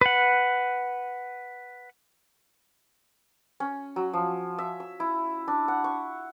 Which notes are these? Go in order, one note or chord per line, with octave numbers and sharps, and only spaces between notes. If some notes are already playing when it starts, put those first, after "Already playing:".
B4 F#5
C#4
F#3
F3
E5
E6
E4
D4
F#5
C#6